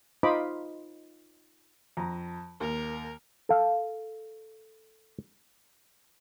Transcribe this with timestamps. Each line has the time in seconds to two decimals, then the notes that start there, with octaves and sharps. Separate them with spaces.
0.23 D#4 F4 C5 D#5 B5 D6
1.97 F2 A#5
2.61 D#2 A#4
3.49 A4 F5